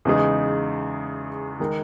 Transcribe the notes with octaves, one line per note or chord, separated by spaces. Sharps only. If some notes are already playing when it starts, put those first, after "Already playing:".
E2 C#3 G#3 D#4 G#4
D#3 G#3 D#4 A#4